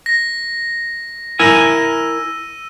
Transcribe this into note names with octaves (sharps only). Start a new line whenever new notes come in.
A#6
E4 A#4 G#5 E6 D#7